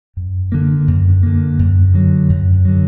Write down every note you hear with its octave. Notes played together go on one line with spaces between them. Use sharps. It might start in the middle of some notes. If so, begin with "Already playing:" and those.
F#2
D3 A#3
F#2
D3 A#3
F#2
D3 F#3
F#2
D3 F#3